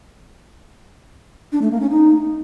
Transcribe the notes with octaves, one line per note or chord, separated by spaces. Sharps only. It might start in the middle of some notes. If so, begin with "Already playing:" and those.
D4
A3
A#3
C#4
D#4